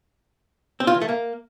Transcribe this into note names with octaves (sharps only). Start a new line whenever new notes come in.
C4
F4
E3
A3
A#3